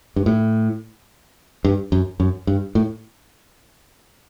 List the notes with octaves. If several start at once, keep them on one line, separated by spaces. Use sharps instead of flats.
G2
A2
G2
F#2
F#2
G2
A2